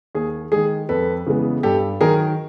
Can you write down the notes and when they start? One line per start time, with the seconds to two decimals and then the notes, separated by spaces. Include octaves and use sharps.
0.15 D#2 G#4
0.52 D#3 G#3 G#4
0.89 F2 A4 B4
1.27 C#3 E3 G#3 B3
1.63 G2 G4 A4
2.01 D#3 F#3 G#4 A#4